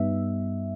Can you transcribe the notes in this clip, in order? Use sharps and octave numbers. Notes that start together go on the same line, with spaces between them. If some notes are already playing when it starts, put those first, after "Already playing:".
Already playing: G2 G3 B3 D#4 E5